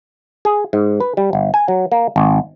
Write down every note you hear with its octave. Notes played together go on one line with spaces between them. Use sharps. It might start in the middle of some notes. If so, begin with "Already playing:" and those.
G#4
G#2
B4
G3
G1
G#5
F#3
A#3
G#1